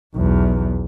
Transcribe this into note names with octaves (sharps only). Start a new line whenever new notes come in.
B1 E2